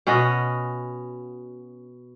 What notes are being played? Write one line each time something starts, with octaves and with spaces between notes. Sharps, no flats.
B2 C#4 F#4 D#5